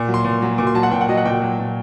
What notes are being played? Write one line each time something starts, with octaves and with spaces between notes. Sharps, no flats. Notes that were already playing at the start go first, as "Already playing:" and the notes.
Already playing: A#2
F#3
C6
A#2
F#3
A#2 D6
C6
F#3 A5
F#5
A#2 G5
F#5
F#3 D#5
F#5
A#2 G5
F#3
A#2